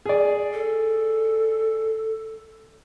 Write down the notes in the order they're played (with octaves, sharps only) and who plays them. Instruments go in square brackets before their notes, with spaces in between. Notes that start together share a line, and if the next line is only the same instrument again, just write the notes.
[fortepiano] G#4 D5
[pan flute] A4